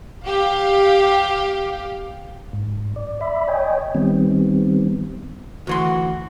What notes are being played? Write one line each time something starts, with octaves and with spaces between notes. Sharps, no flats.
G4 F5
G#2
D5
D5 E5 B5
C#5 D#5 G5 G#5
D#3 G3 B3 C4
D2 E3 F#4 C6